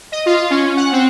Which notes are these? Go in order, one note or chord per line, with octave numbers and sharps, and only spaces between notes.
D#5
F4
F4
C#4
F#5
C4